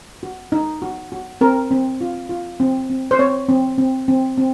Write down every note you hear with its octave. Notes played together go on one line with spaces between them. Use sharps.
F#4
D#4
F#4
F#4
C4 A#4
C4
F4
F4
C4
C4
C5
C4 C#5
C4
C4
C4
C4